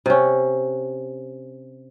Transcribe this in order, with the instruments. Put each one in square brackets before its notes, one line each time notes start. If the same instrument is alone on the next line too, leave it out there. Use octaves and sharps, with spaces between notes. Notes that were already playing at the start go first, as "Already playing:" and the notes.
[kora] C3 C#4